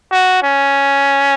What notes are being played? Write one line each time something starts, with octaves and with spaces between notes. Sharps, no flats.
F#4
C#4